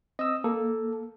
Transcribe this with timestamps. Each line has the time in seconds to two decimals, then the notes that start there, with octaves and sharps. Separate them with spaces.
0.19 C4 D#5 D#6 E6
0.44 A#3 A4